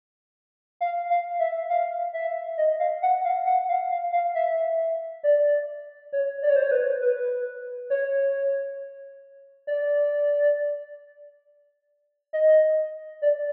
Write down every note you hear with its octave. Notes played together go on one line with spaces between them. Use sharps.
F5
F5
E5
F5
E5
D#5
F5
F#5
F5
F#5
F5
F5
F5
E5
D5
C#5
D5
C#5
C5
C#5
B4
B4
C#5
D5
D#5
D5